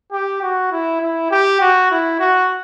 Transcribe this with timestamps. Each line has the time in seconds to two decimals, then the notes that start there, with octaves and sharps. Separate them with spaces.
0.12 G4
0.42 F#4
0.72 E4
1.01 E4
1.31 G4
1.61 F#4
1.91 E4
2.20 F#4